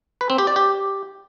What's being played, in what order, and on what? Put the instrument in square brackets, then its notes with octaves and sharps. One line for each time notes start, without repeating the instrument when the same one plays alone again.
[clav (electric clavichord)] B4
C4
G4
D5
G4